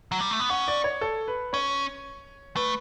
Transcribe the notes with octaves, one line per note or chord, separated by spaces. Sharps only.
F#3
G3
A3
B3
C#4 F#5
D5
C#5
A4
B4
C#4 C#5
A3 B4